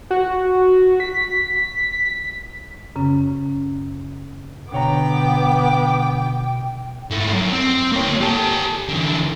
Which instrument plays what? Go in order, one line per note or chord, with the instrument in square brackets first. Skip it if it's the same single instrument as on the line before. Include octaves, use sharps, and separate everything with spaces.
[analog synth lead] F#4
B6
[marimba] F#2 C#3 C#4
[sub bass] B2 [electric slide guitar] D3 C#5 A#5 [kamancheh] B3 D6 [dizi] G5
[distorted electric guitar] G#2 A3
F#2
C4
A#3 C#5
G4 A4
D3 E3